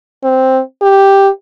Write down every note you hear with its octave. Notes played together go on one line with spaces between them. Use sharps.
C4
G4